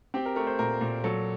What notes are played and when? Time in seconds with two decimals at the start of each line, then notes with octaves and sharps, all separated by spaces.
0.14 C4 G4
0.26 A#4
0.36 A3 A#4
0.47 C5
0.59 A#2 A#4
0.81 A#2
1.04 F#3 A4